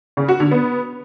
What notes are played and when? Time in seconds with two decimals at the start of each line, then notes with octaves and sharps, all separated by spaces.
0.17 C#3
0.28 F#4
0.40 D3
0.51 B3